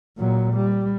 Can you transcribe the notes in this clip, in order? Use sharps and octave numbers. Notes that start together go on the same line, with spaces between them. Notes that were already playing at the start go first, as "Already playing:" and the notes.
A#2 F#3
G3